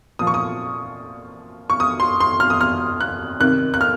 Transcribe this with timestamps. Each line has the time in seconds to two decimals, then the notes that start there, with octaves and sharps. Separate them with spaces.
0.19 A#2 F3 D#6
0.27 C#6
0.34 D#6
1.70 C#6
1.80 D#6
2.00 C6
2.20 C6
2.40 F6
2.50 D#6
2.61 F6
3.01 F#6
3.40 C3 D#3 F#6
3.74 F#6
3.81 F6